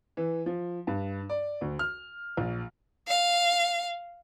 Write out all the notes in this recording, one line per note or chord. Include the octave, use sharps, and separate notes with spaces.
E3
F3
G2
D5
D2
F6
A#1
F5